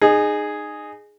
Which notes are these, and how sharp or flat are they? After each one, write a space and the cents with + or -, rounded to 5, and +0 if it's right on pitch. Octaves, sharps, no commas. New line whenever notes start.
D#4 -25 G#4 +0